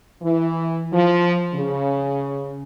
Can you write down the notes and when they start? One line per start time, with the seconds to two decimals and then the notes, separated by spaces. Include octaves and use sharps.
0.22 E3
0.92 F3
1.54 C#3